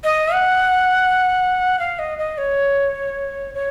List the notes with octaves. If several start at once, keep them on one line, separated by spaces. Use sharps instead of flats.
D#5
F#5
F5
D#5
D#5
C#5
C#5